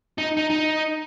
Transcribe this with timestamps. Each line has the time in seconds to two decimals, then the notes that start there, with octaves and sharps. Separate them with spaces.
0.18 D#4
0.37 D#4
0.50 D#4